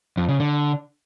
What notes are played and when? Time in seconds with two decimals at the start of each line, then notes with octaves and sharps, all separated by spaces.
0.17 F2
0.29 C#3
0.40 D3